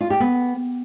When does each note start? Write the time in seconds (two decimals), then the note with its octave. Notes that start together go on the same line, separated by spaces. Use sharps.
0.01 F4
0.10 G4
0.20 B3